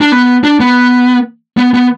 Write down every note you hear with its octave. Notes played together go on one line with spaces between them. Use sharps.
D4
B3
D4
B3
B3
B3